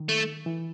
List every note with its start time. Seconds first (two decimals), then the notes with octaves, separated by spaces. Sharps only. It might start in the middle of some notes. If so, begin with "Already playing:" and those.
Already playing: D#3
0.09 A3
0.46 E3